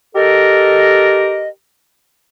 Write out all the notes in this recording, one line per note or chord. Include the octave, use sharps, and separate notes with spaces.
G4 A4 A#4 D#5